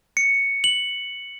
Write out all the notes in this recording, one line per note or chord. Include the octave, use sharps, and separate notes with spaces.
C#7
F#7